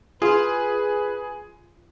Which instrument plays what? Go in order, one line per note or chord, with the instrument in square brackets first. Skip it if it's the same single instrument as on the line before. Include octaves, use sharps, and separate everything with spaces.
[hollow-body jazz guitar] F4 [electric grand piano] G#4 [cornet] B4